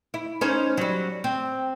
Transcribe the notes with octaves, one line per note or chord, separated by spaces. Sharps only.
E4
C#4 D#4 C5
F#3 G3
C4